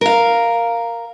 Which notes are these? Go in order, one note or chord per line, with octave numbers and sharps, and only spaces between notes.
A#4 F5